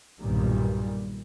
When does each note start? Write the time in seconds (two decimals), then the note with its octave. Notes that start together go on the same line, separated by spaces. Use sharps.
0.20 B1 G2 A#2 D#3 G3